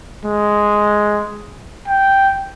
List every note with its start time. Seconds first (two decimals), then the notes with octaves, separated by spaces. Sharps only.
0.25 G#3
1.88 G5